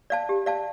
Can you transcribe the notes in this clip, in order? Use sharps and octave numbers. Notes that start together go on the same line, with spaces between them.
D5 F5 A5
G4
D5 F5 A5